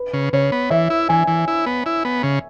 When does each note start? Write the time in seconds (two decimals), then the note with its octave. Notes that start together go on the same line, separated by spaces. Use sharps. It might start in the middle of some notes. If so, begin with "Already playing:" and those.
Already playing: B4
0.13 C#3
0.33 C#3 C#5
0.52 B3
0.70 E3 E5
0.90 E4
1.09 E3 G#5
1.28 E3
1.48 E4
1.66 B3
1.86 E4
2.05 B3
2.23 C#3